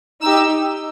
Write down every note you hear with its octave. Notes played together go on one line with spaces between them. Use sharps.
D#4 G4 E6